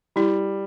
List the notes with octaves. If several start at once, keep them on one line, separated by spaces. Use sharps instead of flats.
G3 E4